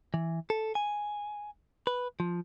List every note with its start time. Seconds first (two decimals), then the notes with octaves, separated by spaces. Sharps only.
0.14 E3
0.50 A4
0.75 G#5
1.87 B4
2.20 F3